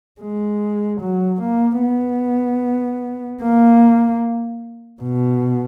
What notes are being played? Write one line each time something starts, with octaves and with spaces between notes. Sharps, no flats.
G#3
F#3
A#3
B3
A#3
B2